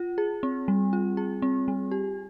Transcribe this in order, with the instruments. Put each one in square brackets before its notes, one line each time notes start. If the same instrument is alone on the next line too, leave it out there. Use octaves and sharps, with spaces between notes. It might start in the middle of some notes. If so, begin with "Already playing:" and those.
Already playing: [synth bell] F4
G#4
C4
G3
F4
G#4
C4
G3
G4